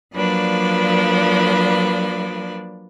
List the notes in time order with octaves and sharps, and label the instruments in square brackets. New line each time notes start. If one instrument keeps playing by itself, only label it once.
[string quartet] F3 F#3 A#3 D4 B4 D5